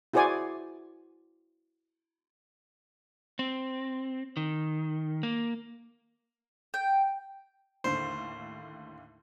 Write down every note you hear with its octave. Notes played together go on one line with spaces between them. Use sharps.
E4 F#4 G#4 C5 D5 G#5
C4
D#3
A#3
G5
D#2 A2 D3 C5